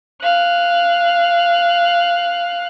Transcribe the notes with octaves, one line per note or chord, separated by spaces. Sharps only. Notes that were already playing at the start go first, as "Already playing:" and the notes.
F5 F#6